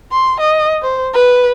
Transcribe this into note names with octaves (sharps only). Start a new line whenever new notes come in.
C6
D#5
C5
B4